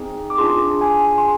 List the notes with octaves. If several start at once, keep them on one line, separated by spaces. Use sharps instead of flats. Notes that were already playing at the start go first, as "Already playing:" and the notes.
Already playing: C4 D#4 G#4
D6
D4 F4 G#4 C6
G#5
C6